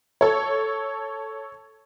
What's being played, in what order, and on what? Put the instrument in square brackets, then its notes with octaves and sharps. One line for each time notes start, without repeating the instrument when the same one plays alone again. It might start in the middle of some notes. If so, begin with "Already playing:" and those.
[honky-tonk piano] A4 C#5